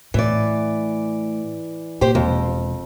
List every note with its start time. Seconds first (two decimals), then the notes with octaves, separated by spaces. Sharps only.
0.14 A2 E3 D5
2.01 A#2 G4 C5
2.15 E1 F2